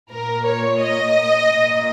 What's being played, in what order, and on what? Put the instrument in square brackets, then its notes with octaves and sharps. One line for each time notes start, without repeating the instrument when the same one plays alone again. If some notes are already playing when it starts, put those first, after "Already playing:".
[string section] A#2 A#4
C#5
D#5
A#2